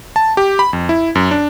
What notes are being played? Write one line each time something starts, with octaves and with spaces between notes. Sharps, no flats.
A5
G4
B5
F2
E4
F#2
D4